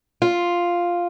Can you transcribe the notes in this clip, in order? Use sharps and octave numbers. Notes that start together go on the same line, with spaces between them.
F4